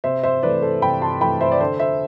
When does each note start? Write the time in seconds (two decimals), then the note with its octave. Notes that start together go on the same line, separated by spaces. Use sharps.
0.04 C3 C5 E5
0.23 C5 E5
0.43 E3 A3 B4 D5
0.62 A4 C5
0.82 C3 G5 B5
1.02 A5 C6
1.21 E3 A3 G5 B5
1.41 C5 E5
1.52 D5
1.60 D3 A4 C5
1.79 C5 E5